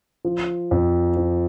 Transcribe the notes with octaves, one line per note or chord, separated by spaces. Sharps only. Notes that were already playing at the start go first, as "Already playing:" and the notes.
F3
F2
F3